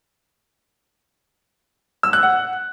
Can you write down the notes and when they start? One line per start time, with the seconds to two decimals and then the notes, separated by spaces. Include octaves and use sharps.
2.03 E6
2.13 F#6
2.23 F#5